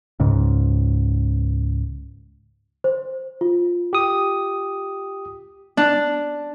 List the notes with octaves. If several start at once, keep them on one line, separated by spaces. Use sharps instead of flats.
C#2 G#2 C#3
C5
F4
G4 D#6
D4